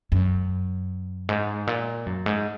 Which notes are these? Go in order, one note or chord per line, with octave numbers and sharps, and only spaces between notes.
F#2
G#2
A#2
F#2
G#2